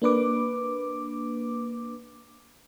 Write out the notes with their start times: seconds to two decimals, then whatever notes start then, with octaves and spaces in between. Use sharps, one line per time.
0.02 A#3 D4 B4 D6